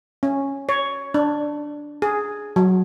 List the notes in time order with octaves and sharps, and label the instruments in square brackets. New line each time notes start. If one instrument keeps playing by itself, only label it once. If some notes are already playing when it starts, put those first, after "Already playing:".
[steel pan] C#4
C#5
D4
G#4
F#3